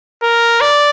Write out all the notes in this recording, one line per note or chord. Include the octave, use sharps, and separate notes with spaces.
A#4
D5